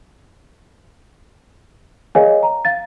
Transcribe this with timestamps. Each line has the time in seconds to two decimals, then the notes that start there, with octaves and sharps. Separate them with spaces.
2.15 G#4 A#4 C#5 D#5 F5 G#5
2.43 A#5
2.65 F5 A6